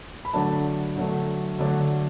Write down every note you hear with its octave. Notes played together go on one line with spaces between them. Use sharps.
B5
D3 F#3 A3 D4 A5
D3 F#3 A3 D4
D3 F#3 A3 D4